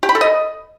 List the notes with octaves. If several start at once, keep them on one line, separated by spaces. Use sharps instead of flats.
G4
B5
A4
D#5